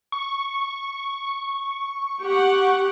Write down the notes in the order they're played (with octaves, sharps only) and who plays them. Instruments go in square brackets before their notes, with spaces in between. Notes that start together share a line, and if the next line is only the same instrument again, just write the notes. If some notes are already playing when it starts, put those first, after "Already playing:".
[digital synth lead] C#6
[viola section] G4 F#5